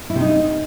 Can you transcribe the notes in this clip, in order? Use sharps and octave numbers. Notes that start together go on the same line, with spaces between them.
E4
C3
D#4